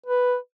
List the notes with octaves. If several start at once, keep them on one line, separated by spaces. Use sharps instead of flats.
B4